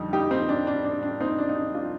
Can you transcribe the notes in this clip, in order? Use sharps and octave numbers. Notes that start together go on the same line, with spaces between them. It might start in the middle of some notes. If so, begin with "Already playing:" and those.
Already playing: F2 D3 G3 D#4
D#4 G4
C4 D#4
D4
D4
D4
D4
C4 D#4
D4
D#4
D4
D4 F4